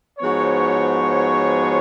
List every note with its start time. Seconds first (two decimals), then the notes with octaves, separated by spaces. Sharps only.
0.17 G#2 F3 B3 F#4 C#5